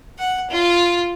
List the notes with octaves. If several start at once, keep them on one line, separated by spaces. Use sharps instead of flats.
F#5
F4